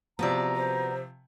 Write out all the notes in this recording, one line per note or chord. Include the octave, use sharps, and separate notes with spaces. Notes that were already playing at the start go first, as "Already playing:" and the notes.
C3 F3 B3 F#4 D5 A#5
C5